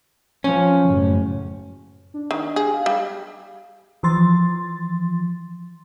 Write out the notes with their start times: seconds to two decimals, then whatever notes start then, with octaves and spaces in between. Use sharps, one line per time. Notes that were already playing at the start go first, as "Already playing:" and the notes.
0.44 F3 C#4
0.87 F#1 A2
2.14 D4
2.31 D#3
2.56 G4 G#4
2.74 F5
2.86 G3
4.03 E3 F3 C6 A6